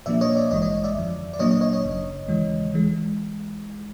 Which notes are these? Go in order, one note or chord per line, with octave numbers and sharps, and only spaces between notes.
A#2 F3 A#3 D4 D5 E5
C#5 D#5
D5 E5
A1 G2 E3 G#3 C#5 D#5
C#5 D#5
D5 E5
F2 D3 F3
D5
A#2 F#3 A#3 D4 C#5 D#5
C#5 D#5
C#5 D#5
C#5 D#5
G1 F#2 C#3
D#2 C#3 E3 G#3
E3 G#3